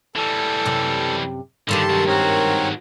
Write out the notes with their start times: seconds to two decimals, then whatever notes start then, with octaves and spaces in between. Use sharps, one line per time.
0.15 E3 G3 A4
0.65 F#2 C3
1.69 G2 D3 D#3 G4 A4 A5 C6
1.90 C2 F#3
2.07 G#2 C4 F#4 A#4 C#5